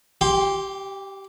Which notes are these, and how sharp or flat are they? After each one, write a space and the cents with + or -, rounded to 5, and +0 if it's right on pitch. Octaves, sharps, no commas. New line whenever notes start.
G4 -15 G5 +30 C6 +10